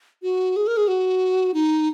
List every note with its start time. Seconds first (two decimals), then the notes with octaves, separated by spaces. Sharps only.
0.23 F#4
0.56 G#4
0.67 A#4
0.77 G#4
0.88 F#4
1.54 D#4